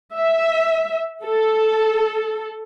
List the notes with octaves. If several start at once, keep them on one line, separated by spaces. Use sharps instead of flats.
E5
A4